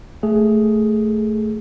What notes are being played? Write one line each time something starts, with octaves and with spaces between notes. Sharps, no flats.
A3 G#4 A4